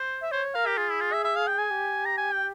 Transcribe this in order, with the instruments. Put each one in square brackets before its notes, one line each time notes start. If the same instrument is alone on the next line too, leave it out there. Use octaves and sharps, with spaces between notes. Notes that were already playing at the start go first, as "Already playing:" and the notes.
Already playing: [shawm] C5
[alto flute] E5
[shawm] C5 [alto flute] C#5
[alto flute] A#4 [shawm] F5
[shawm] G4
[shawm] F4 [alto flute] G#4
[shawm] E4
F4
E5
E5
F5
G5
G#5
[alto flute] G4
[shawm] A#5
G#5
G5